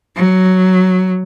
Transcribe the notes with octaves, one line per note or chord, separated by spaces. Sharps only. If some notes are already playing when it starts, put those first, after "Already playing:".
F#3